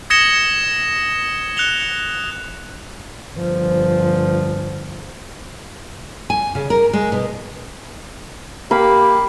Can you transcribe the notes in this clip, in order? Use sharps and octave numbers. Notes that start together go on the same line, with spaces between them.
D#6 G#6 A#6 C#7 E7 G7
F#6 C#7 F7 G7
G1 F3
G#5
C#3
A#4
G#3
B2
A#3 G4 B5